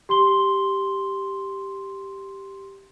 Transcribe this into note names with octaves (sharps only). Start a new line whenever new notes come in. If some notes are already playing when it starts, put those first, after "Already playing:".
G4 C6 G7